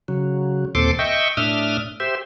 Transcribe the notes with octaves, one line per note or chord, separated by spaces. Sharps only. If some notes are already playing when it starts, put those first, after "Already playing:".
C#3 F#3
D#2 A#2 C4 A4 C6 D6
D#5 E5 G5 C#6
A2 D4 E5 D#6 F6
G4 C5 E5